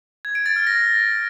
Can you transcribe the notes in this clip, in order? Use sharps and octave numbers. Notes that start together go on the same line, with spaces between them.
G#6
D7
A6
F6
A#6